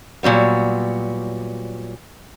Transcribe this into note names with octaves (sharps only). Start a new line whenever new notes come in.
A#2 F#3 G3 B3